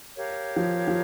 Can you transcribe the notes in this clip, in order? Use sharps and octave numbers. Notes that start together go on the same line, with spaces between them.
G4 A#4 C#5 F5
F3
F3